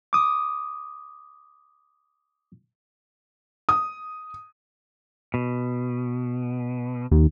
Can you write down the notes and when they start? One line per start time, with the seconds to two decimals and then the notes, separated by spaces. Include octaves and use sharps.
0.13 D6 D#6
3.69 D#6
5.34 B2
7.11 D#2